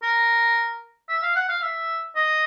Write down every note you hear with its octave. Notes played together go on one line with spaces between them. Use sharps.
A#4
E5
F5
F#5
F5
E5
D#5